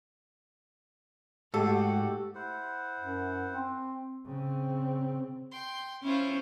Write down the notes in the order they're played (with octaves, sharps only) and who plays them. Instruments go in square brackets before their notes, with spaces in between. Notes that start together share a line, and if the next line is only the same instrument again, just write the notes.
[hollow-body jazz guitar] G#2 [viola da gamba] A3 F#4 [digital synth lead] G4 [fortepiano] A4
[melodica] E4 C5 F#5
[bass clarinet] F#2
C4
[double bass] C#3 C4
[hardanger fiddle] G5 C6
[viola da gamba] C#4 C5 [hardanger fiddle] E4 F4